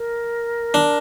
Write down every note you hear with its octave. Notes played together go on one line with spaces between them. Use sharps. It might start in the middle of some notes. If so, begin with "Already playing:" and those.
Already playing: A#4
D4